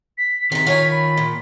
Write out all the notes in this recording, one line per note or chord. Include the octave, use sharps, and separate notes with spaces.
B6
C3 D#3 A#5 B6
D#3 F4 C#5 G#5
B5
A#2